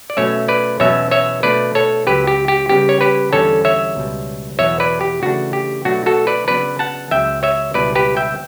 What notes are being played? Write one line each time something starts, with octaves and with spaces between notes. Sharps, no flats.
D5
B2 F#3 A3 C#4 C#5 E5
B4 D5
E2 B2 F#3 C#4 E4 C#5 E5
C#5 E5
B2 A3 D4 B4 D5
A4 C#5
C#2 C#3 F#3 G4 B4
G4
G4
C#3 G3 B3 G4
C#5
G4 B4
E2 D3 G3 C#4 A4 C#5
C#5 E5
C#2 B2 G3
E2 B2 F#3 B3 C#5 E5
B4 D5
G4
C#3 E3 A3 D4 F#4
G4
B2 F#3 A3 D4 F#4
F#4 A4
B4 D5
C#3 F#3 B3 D4 B4 D5
F#5 A5
C#2 C#3 F#3 E5 G5
C#5 E5
C#2 B2 G3 B3 E4 B4 D5
G4 B4
E5 G5